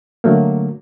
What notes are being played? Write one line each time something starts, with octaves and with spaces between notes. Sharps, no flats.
D3 F#3 A3 A#3